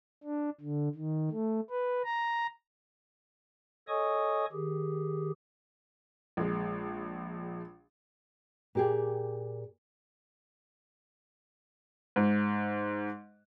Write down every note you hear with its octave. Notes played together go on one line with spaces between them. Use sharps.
D4
D3
D#3
A3
B4
A#5
A4 C#5 D#5 G#5 C#6 D#6
D#3 G4 G#4
A#1 G#3
A#2 G4 G#4
G#2